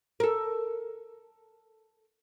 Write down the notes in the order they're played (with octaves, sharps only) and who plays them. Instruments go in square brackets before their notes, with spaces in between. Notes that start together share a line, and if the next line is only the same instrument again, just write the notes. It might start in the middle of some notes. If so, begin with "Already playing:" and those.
[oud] A4 A#4